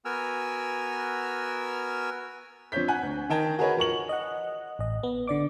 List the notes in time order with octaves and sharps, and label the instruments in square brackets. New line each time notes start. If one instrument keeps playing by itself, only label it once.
[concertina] B3 F#4 A#4 G#5 E6 F6
[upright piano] F3 C4 D4 C#5 G6 B6
F#5 G#5 F#6
D2
D#3 A#4 D#5 G5 A5 G#6
F#4 G#4 A#4 B4 C#5 D#5
F3 A#4 C#6 F#7
[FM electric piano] D#5 F#5
A1 D#5
B3
D3 D5 D6